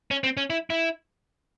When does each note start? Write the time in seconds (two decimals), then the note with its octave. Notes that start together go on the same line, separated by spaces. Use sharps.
0.11 C#4
0.24 C4
0.37 C#4
0.50 E4
0.70 E4